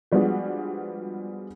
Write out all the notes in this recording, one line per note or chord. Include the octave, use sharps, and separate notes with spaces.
F3 G3 G#3 B3 D4 F#4